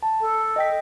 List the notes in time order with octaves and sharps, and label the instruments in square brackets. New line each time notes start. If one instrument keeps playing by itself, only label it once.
[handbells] A5
[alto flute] A4
[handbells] D#5 G5 B6